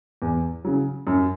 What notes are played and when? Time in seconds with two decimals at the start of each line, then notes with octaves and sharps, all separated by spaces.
0.22 E2
0.65 C#3 F#3
1.07 F#2